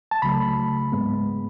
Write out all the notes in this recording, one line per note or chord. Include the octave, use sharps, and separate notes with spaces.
A5
C#2 C#3 F#3 A3 B5
G#2 G#3 B3